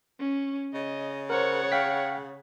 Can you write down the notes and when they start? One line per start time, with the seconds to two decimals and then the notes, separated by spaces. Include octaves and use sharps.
0.20 C#4
0.74 C#3 D#5
1.30 A#4 C5 C#5 F#5
1.72 F5 G5 B6